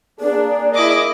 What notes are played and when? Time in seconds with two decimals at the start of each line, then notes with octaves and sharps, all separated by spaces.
0.20 A#3 D4 G#4 D5
0.74 E4 D#5 D6